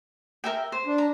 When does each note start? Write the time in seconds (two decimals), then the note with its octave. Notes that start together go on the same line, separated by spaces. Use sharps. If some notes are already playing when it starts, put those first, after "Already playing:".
0.44 A#4 E5 G5
0.72 C5
0.86 D4
0.98 A#5